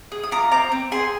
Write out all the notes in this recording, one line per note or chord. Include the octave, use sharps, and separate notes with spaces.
G#4
D#6
F4 A#5 D6
C4 A#5 D6
C4
G#4 G#5 C6